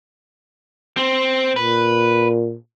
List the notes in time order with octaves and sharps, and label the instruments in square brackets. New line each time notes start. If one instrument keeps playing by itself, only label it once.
[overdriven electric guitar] C4
[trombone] A#2 [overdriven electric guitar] B4